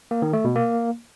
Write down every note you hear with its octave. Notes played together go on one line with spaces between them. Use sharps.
A#3
D#3
A3
B2
A#3